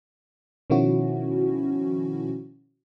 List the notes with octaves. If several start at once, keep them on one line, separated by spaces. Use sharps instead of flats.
B2 D#3 F3 C#4 E4 F#4